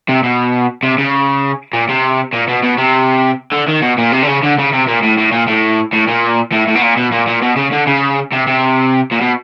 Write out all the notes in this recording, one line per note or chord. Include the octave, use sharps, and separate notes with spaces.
C3
B2
C3
C#3
A#2
C3
A#2
B2
B2
C3
D3
D#3
B2
A#2
C3
D3
C#3
D3
C#3
C3
A#2
A2
A2
A#2
A2
A2
A#2
A2
A2
B2
A#2
B2
A#2
A#2
B2
C#3
D3
C#3
C3
C3
A#2
B2